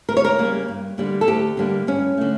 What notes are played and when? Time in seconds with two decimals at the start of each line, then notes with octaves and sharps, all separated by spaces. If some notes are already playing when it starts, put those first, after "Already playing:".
0.09 D2 A#4
0.17 C#5
0.25 A#4
0.38 C#3 G3 A#3
0.68 G2
0.98 D3 G3 A#3
1.21 A4
1.28 D2 G4
1.57 D3 G3 A#3
1.87 G2 C#4
2.17 D3 A3